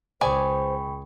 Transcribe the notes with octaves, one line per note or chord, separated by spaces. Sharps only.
C#2 G#4 C5 D5 G5 G#5 B5 C#6